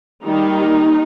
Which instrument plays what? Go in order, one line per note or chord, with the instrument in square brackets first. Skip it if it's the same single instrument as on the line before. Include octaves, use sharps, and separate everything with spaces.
[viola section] D#3 G3 A#3 D#4